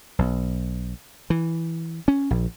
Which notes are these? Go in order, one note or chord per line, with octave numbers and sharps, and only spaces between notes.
B1
E3
C#4
A#1